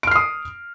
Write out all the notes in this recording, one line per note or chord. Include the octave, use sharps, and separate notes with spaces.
D#6 F6 C7 D7